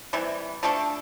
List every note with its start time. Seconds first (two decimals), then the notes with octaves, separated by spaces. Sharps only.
0.13 C3 E3 G3
0.63 F3 A3 D4 A4